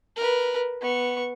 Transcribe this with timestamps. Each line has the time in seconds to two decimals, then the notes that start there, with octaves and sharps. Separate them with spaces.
0.16 A#4 B4
0.81 B3 C#6